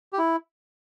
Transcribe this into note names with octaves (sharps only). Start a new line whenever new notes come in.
G4
E4